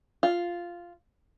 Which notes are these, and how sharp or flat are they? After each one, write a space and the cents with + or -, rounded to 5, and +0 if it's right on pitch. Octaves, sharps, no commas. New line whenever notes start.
F4 -5